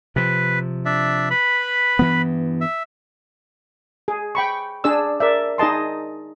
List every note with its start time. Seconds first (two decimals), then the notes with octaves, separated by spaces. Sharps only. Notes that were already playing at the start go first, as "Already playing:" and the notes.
0.16 C3 F3 B4
0.85 D4 E5
1.30 B4 B5
1.99 G2 E3 B3
2.61 E5
4.08 G#4
4.35 G5 B5 C#6
4.84 D4 G#4 D5 E6
5.20 A#4 D5 E5
5.58 D#4 G#4 D#5 A5 C6